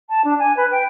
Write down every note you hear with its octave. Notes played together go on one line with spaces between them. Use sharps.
A5
D4
G#5
B4
G5